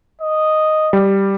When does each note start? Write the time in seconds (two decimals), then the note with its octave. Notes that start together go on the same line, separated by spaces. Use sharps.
0.21 D#5
0.93 G3